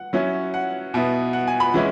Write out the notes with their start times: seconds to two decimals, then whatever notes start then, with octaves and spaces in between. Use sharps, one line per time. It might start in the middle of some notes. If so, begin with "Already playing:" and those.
Already playing: F#5
0.13 F#3 C#4 E4
0.54 F#5
0.94 B2 B3 E4
1.33 F#5
1.47 G#5
1.60 B5
1.74 E3 G#3 C#4 E4